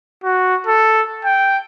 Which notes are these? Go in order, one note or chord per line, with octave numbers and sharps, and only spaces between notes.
F#4
A4
G5